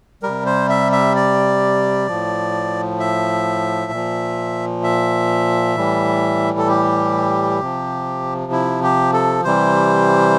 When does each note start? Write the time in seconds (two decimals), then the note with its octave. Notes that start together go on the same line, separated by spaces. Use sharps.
0.23 C3 G3 A#4
0.46 C5
0.69 E5
0.92 E5
1.15 D5
2.07 A2 F3
3.00 E5
3.92 A#2 F3
4.84 E5
5.76 A2 E3 G3
6.58 A4
6.68 G4
7.60 C3 F3
8.52 E4
8.83 G4
9.13 A4
9.44 C3 E3 G3 C5